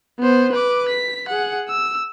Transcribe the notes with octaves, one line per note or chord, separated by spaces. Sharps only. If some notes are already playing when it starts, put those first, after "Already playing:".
B3 C5
B4 D6
B6
G#4 F#5
E6